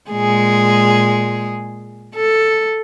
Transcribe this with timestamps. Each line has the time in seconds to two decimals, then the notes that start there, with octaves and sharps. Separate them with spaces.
0.10 A#2 G#3 G#4
2.15 A4